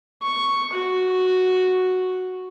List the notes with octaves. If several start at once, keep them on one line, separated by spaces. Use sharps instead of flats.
C#6
F#4